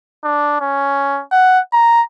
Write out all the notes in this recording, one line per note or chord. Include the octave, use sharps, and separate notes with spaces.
D4
C#4
F#5
A#5